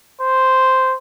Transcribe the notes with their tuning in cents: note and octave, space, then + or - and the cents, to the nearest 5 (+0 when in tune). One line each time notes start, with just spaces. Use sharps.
C5 -5